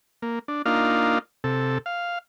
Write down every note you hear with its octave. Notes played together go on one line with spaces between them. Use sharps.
A#3
D4
A#3 D4 D#4 F4 F5
C3 A4
F5